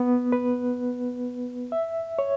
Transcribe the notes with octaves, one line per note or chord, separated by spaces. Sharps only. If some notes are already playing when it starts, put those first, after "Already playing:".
Already playing: B3
B4
E5
C#5